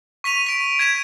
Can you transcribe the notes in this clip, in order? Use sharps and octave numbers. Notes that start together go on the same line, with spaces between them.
C#6 B6 D#7 F7
B6 D7
G#6 B6 E7